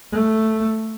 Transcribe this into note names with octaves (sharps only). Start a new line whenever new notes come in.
A3